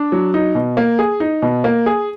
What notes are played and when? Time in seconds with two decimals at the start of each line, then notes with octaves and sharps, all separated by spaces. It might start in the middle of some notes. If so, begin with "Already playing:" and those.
Already playing: D4
0.12 F#3
0.34 D#4
0.55 B2
0.77 A#3
0.99 G#4
1.20 D#4
1.42 B2
1.64 A#3
1.86 G#4